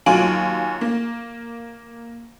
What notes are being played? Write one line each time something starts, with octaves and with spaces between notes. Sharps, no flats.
D#2 F#3 F4 G#5 D7 F#7
A#3